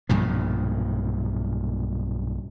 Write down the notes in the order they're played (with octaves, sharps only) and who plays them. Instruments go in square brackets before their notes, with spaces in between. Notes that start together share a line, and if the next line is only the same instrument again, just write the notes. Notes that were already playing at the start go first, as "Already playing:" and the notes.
[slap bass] B1 G2 A#2 F3